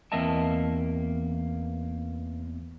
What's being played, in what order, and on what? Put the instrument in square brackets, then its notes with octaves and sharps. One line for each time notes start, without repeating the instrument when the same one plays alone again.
[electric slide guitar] E2 A#3 C4 D#5 E5 A5